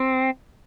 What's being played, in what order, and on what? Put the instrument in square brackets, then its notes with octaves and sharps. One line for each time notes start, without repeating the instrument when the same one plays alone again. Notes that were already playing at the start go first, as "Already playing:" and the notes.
Already playing: [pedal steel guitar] C4